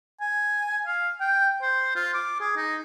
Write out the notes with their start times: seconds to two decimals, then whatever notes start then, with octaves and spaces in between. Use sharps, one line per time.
0.21 G#5
0.86 F5
1.20 G5
1.62 C5
1.96 F4
2.14 D6
2.40 G#4
2.56 D#4